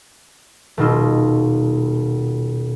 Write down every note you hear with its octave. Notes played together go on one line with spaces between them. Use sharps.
D#1 B2 G3 D#4 F4 E6